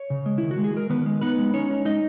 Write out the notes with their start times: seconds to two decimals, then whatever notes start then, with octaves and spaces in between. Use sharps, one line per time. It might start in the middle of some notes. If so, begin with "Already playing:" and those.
Already playing: C#5
0.10 C#3
0.26 G#3
0.38 D#3 E4
0.51 F#4
0.58 G#3
0.64 G#4
0.74 G#3 A#4
0.90 D#3 B3 B4
1.06 G#3
1.21 B3 D#4 B4
1.38 G#3
1.54 C#4 D#4 C#5
1.70 D#4
1.85 G#3 D#4 D#5